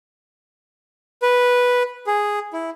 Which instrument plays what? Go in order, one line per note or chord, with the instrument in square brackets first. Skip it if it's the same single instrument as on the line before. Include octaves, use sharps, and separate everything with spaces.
[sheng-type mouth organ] B4
G#4
E4